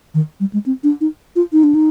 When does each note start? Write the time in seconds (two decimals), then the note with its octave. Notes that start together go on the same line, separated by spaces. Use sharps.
0.14 D#3
0.40 G3
0.53 G#3
0.66 C4
0.84 D4
1.01 D#4
1.36 F4
1.53 D#4
1.63 D4
1.74 D#4